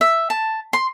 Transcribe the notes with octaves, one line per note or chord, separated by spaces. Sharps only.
E5
A5
C6